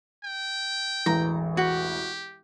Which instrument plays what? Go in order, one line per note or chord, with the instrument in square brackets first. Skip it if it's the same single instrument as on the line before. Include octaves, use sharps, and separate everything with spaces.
[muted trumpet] G5
[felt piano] E1 A1 E3 [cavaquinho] A#5
[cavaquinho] F#4 [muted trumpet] G4